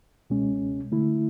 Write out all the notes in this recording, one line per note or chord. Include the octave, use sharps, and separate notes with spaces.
C#2 B2 G#3 C#4
D3 A3 E4